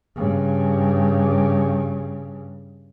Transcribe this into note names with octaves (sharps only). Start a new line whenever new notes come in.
G2 C#3